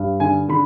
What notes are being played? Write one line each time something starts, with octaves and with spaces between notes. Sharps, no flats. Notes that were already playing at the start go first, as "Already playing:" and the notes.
Already playing: G2
D3 G#5
D3 B5